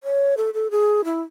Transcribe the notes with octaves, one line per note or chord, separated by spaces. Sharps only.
C#5
A4
A4
G#4
E4